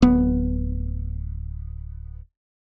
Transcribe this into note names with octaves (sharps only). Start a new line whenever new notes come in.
D1 B3